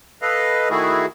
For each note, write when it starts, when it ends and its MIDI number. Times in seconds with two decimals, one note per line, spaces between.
0.22 0.69 69
0.22 0.69 71
0.22 0.69 75
0.22 0.69 77
0.70 1.06 51
0.70 1.06 57
0.70 1.06 64
0.70 1.06 66
0.70 1.06 68